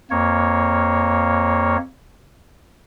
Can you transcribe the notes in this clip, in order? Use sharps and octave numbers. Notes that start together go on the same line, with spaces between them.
F2 A#3 C#5